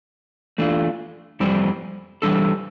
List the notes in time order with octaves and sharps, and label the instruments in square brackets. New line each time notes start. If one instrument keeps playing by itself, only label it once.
[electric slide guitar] E3 A3 D4 F4
F2 E3 G3 C4
E3 G3 D4 A4